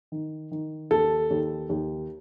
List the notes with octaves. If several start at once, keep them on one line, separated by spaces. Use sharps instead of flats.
D#3
D#3
D#2 A4
D#2
D#2